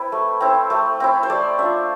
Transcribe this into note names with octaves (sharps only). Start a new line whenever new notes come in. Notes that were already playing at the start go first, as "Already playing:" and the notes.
Already playing: C4 E4 B4
A3
C4 E4
A3
C4 E4
C5
A3 D5
D4 F4 E5